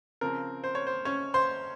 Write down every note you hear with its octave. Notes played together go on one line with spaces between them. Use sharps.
C#3 F3 C4 A#4
C5
C#5
C5
C#4 C#5
C5 C6